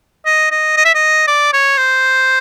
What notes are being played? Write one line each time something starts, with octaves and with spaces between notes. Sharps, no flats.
D#5
D#5
D#5
E5
D#5
D5
C#5
C5